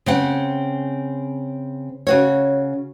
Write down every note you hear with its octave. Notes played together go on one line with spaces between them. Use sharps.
C#3 C4 F#5
C#3 F#4 C#5